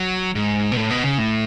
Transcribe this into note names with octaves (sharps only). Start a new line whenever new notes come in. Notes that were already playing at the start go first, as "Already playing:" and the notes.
Already playing: F#3
G#2
B2
A2
B2
C#3
A2